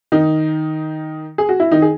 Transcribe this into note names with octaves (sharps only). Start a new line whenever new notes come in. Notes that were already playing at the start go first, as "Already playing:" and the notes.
D#3 D#4
G#4
F#4
E4
D#3 D#4
G#4